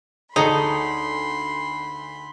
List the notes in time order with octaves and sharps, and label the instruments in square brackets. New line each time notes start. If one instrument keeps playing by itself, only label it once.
[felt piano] D2 [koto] D#4 [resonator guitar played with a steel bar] G#4 A4 C#5 [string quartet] B5 C6